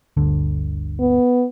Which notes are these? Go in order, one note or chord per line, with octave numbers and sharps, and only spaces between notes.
G1 D2 D3
B3